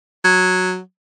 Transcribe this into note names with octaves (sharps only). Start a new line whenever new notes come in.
F#3